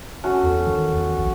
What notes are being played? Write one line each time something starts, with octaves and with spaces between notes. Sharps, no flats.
C#4 F#4 A4
E2
D#3
E2
A#1